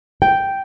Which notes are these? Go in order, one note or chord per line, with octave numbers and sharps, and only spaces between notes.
G5